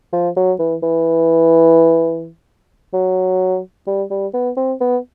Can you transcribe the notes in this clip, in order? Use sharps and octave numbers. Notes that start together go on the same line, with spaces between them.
F3
F#3
E3
E3
F#3
G3
G3
B3
C4
B3